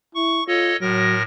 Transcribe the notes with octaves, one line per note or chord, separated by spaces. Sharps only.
E4 C#6
F4 A4 C#5 D#5
A2 F#3 A#4 A#6